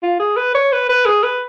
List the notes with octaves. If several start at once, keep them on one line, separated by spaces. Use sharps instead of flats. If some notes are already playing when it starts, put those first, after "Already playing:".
F4
G#4
B4
C#5
B4
B4
G#4
B4